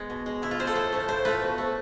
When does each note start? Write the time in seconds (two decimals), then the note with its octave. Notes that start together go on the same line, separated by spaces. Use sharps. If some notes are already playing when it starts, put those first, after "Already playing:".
Already playing: G#3 B3
0.10 B2
0.26 G#3
0.42 B2 E4
0.51 F4
0.59 G#3 C5
0.67 A4
0.75 A2 C5
0.92 F3 A3
1.08 A2 C5
1.25 F3 A3 B4
1.42 B2
1.58 A3